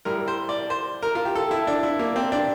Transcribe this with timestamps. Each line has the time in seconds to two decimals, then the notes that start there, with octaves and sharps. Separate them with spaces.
0.05 A2 G3 A#4
0.28 C5
0.49 D5
0.70 C5
1.03 A#4
1.15 F4
1.25 G4
1.35 A4
1.51 E4
1.67 D4
1.83 E4
1.99 A#3
2.16 C4
2.32 D4